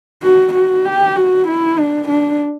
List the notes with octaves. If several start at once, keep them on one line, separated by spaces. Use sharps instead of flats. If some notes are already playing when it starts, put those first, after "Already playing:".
F#4
F#4
G4
F#4
E4
D4
D4